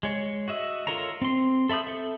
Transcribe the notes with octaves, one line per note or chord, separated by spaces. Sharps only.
G#3 C#5
F#4 D#5 E5
F4 A4 A#4 C#5 A#5
C4 C6
A4 E5 B5 D#6 G6
A4 E5